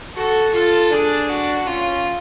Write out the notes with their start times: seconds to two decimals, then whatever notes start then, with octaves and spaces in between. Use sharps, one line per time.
0.16 F#4 A4
0.53 F4 A4
0.91 D4 G#4
1.29 F#4
1.67 C#4 F4